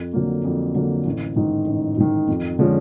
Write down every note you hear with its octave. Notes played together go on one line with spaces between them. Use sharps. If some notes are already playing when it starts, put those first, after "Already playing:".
Already playing: F2
D3 F#3 A#3
F2
D3 F#3 A#3
A1
G#2 D#3
A1
G#2 D#3
F2
D3 F3 G#3 C#4